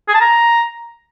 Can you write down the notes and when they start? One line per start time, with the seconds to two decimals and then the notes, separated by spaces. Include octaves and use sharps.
0.08 G#4
0.14 A5
0.21 A#5